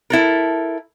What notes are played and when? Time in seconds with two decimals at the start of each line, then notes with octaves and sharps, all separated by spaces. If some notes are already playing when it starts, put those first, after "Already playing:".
0.10 E4 A4 A#4